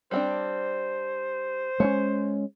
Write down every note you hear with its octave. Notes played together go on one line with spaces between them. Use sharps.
G3 C4 D4 C5
G#3 A3 C#4 C#5